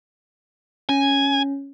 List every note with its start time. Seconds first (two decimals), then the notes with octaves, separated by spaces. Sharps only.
0.89 C#4 G#5